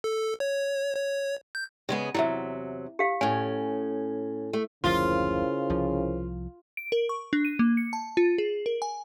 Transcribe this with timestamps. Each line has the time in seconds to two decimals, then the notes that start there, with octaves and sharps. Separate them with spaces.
0.04 A4
0.40 C#5
0.95 C#5
1.55 G6
1.89 C#3 G#3 B3
2.14 E2 C3 F#3 E4 E5
2.99 G4 F5
3.21 A2 C#4 G#5
4.53 A3
4.84 F#1 D2 C#3 F3 E4 F4 A#4 C5
5.70 C2 F3
6.77 D7
6.92 A#4
7.09 C#6
7.33 D4
7.45 D#7
7.59 A#3
7.77 C#7
7.93 A5
8.17 F4
8.38 G#4
8.66 A#4
8.82 G#5